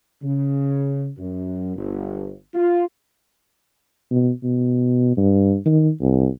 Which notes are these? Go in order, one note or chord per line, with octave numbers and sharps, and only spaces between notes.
C#3
F#2
G1
F4
B2
B2
G2
D#3
C2